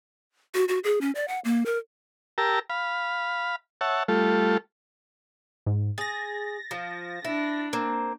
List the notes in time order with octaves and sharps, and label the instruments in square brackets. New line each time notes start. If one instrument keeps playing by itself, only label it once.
[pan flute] F#4
F#4
G#4
C#4
D5
F#5
A#3
A#4
[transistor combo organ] G4 A#4 A5 A#5 E6
F5 B5
C#5 E5 F#5 A5
G3 A3 F4 A4
[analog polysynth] G#2
[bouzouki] G#4 [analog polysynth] A6 A#6
[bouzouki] F3
[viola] D4 [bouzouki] E4
[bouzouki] A#3 C4